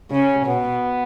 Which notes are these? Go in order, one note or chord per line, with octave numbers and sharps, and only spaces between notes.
C#3 C#4
B2 B3